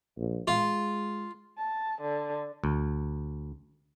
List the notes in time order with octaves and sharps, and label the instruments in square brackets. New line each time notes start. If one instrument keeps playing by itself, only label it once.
[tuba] A#1
[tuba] G#3 [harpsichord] F4
[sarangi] A5
D3
[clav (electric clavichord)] D2